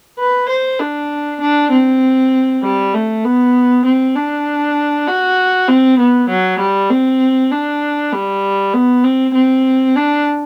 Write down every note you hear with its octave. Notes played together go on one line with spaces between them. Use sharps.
B4
C5
D4
D4
C4
G3
A3
B3
C4
D4
F#4
C4
B3
F#3
G3
C4
D4
G3
B3
C4
C4
D4